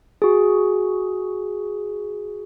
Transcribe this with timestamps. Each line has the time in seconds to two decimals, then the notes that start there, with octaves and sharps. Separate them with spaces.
0.22 F#4 G#4